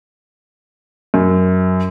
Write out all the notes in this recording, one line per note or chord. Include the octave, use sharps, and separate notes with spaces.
F#2